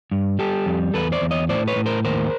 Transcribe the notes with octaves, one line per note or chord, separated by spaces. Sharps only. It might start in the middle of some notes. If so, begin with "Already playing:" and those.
G2
G3 G4 A4
F2
E2 A4 B4
C5 D5
E2
C#5 D#5
A2 C5 D5
B4 C#5
A2
A#4 C5
D#2 A#4 C5